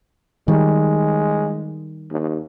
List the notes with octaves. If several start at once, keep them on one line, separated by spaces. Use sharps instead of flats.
D#3 G3 G#3
D#2